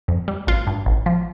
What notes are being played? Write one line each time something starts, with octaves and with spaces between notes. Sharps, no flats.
F2
G3
A1 F4
G2
A1
F3